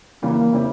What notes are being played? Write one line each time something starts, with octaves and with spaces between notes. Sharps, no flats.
C#3 E3 G3 A#3
C#3 G3 C4 E4